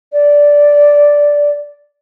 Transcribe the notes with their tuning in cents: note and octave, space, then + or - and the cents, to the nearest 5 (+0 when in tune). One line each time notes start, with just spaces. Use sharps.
D5 -5